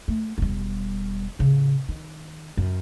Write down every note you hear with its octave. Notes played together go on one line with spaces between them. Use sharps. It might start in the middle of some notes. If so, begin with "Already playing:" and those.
A3
E1 G3
A1 C#3
D#3
F#2